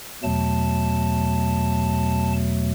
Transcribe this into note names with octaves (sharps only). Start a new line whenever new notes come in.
E2 B2 F#3 A3 A5